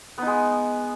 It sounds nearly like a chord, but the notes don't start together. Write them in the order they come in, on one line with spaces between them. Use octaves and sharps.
B3 D#4 G#3